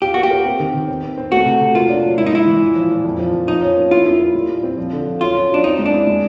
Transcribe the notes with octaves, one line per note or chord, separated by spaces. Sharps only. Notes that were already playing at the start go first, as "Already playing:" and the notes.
F4 G4
A#3 F#4
G4
A#4
C4
D#3
D#3
C4
C4
C4
A3 F#4
C3
C3
A#3 F4
D4
F#3
G#2 E4
D#4
G#2 E4
E3
A#2
F3
A#2
F2
F3
F2
F3 D#4
C#4
A#3
E4 F4
E4
E4
G3
A#2
C4
F3
D3
F3
F#3 F4
C#4
F#3 D4
C4 D#4
G#3
D4
E4
G#3